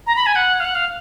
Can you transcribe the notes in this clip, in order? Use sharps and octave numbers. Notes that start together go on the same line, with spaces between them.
A#5
B5
G#5
F#5
F5
F#5
F5